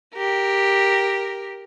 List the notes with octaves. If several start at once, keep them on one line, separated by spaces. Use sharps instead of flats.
G4 A#4